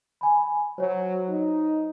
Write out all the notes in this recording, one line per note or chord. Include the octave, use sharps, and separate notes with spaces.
G#5 B5
F#3 C5 C#5
D#4